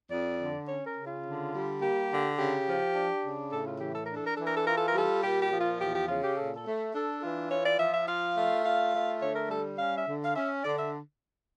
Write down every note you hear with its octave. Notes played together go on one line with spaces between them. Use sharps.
F2 D5
D3
C#4 C#5
A#4
C#3
F4
D3
G3
A#3 G4
D3
C#3 G4
F3
D4
C#3
A2 A4
F4
E3 G4
A4
D4 A#4
A4
A#4
E3 A4
A#4
A4
F4 A#4
A4
A#4
G3 A4
A#2 G4
G4
F3
F4
E2 G4
G4
C#3 F4
G4
A#2 A4
A4
A3
D4 A4
E3 F4
F4 C#5
D5
F3 E5
E5
F4 F5
A3
F4 F5
A3
D3 C#5
A#4
G3 A4
C#4 F5
E5
D3
F5
C#4 E5
D3 D5
E5